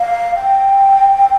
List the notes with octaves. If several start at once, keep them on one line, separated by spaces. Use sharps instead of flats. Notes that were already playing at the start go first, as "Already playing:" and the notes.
Already playing: F5
G5